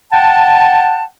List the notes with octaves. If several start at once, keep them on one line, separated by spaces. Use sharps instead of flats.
F#5 G5 A5